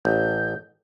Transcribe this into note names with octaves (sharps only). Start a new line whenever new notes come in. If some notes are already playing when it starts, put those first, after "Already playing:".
A1 G6